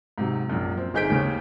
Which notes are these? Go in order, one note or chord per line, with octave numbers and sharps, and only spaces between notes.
G#2 C3 F#3
A#1 F#2
C4
G1 D#4 G#4 G6 B6 D7
D#2 C#3 C#5